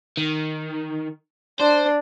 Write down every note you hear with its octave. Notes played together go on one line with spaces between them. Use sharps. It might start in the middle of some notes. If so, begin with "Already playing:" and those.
D#3
D4 C5